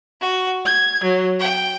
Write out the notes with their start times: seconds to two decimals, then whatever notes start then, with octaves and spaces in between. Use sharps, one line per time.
0.20 F#4
0.65 G#6
1.03 F#3
1.39 G5